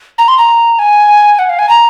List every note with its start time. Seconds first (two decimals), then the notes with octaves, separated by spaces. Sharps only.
0.18 A#5
0.28 C6
0.38 A#5
0.79 G#5
1.39 F#5
1.49 F5
1.59 G#5
1.69 A#5